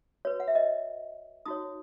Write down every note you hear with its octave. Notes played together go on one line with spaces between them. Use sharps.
F#4 B4 C#5
F#5
E5
D#5
D#4 F#4 C#5 D#6